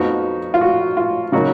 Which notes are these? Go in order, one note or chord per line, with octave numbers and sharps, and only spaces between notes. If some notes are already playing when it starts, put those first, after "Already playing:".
Already playing: F2 F3 B3 D#4 F#4
F4
F#4
F4
C#3 F#3 A#3 D#4 F#4